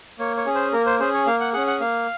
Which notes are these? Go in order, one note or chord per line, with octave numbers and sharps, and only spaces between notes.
A#3 C#5
C#5
C#4 G#4
C5
A#3 A#4
C5
C#4 G#4 C5
C#5
A#3 F5
F#5
C#4 G#4 F#5
F#5
A#3 F5